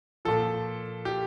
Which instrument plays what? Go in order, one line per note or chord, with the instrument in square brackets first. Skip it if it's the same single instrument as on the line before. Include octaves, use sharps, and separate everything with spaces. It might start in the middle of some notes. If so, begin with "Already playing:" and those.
[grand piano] A#2 F3 A4
G4